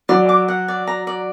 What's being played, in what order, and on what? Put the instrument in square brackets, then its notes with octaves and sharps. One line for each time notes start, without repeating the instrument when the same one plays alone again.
[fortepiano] F#3 [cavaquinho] D5
[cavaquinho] D6
F#5
D5
A#5
D5